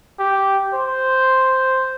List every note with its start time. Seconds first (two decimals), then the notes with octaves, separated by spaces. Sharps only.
0.19 G4
0.74 C5